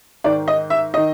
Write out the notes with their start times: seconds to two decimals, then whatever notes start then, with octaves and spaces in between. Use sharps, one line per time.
0.24 G#2 D#3 D5
0.48 D#5
0.70 E5
0.94 D#3 D#5